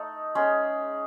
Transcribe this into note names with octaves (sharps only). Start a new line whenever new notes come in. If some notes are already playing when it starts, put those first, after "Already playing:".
Already playing: A3 D#4 A4
G#3 C#4 G#4